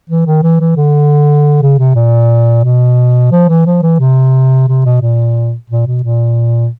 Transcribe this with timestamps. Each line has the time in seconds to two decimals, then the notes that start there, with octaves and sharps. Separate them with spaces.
0.09 E3
0.26 D#3
0.43 E3
0.60 E3
0.77 D3
1.62 C#3
1.79 C3
1.95 A#2
2.64 B2
3.32 F3
3.48 E3
3.66 F3
3.82 E3
4.00 C3
4.68 C3
4.85 B2
5.02 A#2
5.70 A#2
5.87 B2
6.03 A#2